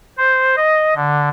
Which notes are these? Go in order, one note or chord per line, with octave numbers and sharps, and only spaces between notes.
C5
D#5
D3